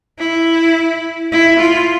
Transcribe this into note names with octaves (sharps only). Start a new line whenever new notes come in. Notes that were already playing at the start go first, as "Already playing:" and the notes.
E4
E4
F4